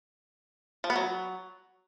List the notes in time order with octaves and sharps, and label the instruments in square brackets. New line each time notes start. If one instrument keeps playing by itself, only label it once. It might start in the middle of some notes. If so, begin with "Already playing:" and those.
[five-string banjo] F3
B3
F#3